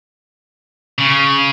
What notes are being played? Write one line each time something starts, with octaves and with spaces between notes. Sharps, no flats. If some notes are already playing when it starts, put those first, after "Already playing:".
C#3